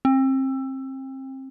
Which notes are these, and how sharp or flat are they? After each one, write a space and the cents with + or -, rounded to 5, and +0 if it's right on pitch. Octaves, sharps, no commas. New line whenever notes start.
C4 +30